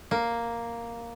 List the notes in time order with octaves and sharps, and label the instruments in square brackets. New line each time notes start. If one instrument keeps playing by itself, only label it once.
[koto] A#3